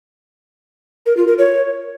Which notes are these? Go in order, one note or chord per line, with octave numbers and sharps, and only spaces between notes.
A#4
F4
A#4
C#5